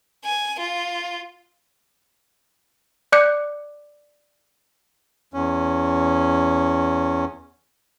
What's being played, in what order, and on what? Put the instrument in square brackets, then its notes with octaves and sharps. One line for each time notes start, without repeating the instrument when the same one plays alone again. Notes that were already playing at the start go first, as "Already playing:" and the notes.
[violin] G#5
F4
[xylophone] D5 D6 F#6 G6 C#7
[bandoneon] E2 C#4